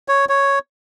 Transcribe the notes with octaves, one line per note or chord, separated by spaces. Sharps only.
C#5
C#5